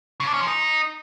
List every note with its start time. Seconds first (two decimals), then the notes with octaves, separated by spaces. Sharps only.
0.20 C#3
0.27 D4
0.34 C#4
0.40 F3
0.47 D#4